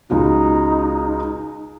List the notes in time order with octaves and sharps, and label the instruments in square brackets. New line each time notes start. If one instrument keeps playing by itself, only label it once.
[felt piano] C#2 F4 F#4 [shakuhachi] D#4